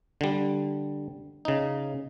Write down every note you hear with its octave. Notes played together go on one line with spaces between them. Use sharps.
D3 G3
C#3 D#4